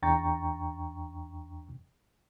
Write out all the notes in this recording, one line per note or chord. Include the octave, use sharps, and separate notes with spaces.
E2 D4 G5 A#5 C#6 A6